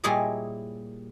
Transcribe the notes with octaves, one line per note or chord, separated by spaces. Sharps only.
A#2 G3 E4 G#4 C#5 D#5